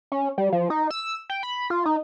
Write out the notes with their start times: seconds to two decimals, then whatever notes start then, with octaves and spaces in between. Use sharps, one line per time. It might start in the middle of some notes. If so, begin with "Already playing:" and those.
0.12 C#4
0.38 G3
0.52 F3
0.70 D#4
0.91 E6
1.30 G5
1.43 B5
1.70 F4
1.85 D#4